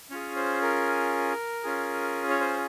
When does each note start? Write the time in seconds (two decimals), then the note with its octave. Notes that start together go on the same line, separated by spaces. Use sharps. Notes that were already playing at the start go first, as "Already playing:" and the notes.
0.10 C#4 F4 G#4 C#5
0.36 C5
0.62 A#4
1.64 C#4 F4 G#4
2.29 C#5
2.40 C5